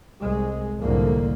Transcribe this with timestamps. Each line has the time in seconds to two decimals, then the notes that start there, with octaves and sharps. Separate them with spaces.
0.21 C2 G#3
0.80 C2 F2 A2 D3 A#3